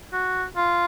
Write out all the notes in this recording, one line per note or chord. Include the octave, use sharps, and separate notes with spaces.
F#4
F4